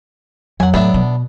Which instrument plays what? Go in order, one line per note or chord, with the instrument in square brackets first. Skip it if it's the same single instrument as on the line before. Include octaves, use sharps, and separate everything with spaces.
[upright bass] F2 [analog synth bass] F#3 [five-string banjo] F#5 G#5
[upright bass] A2 [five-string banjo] B3 D4 E5
[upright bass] B2